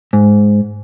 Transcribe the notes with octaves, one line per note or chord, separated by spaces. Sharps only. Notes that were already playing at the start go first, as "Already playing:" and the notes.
G#2